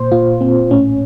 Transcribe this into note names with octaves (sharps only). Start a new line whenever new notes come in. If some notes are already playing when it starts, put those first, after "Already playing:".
Already playing: A#2 C5
A#2 F4
A#2 C4
A2 C#4